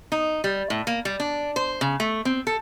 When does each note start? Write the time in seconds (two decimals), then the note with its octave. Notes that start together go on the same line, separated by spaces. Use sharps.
0.12 D#4
0.44 G3
0.70 A2
0.87 A#3
1.05 G3
1.20 D4
1.56 C5
1.81 C#3
2.00 A3
2.25 C4
2.47 A4